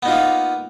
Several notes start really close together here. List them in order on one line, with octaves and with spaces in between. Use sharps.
B3 D#4 F4 A#3